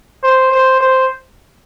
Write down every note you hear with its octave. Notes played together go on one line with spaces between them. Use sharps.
C5
C5
C5